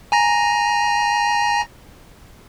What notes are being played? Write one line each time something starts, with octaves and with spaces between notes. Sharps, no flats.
G#5 A#5 A#6